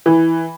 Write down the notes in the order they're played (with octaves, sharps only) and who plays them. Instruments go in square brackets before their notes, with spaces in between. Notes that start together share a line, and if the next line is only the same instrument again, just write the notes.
[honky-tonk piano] E3